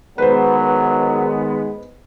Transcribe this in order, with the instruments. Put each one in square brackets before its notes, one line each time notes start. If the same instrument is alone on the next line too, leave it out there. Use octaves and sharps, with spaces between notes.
[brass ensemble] D#3 G#3 B3 [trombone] F#3 [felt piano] B4 C5